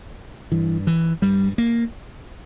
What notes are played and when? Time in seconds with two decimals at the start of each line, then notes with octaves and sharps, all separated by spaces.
0.52 G2 E3
0.87 E3
1.22 G2 G3
1.58 A#3